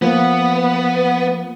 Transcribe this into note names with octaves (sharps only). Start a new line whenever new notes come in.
F3 A#3 B3